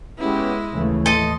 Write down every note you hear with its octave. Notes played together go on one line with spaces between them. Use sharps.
G#3 B3 C#4 E4 G4
D#2 C#3 E3 A3
A2 A4 D#5 C6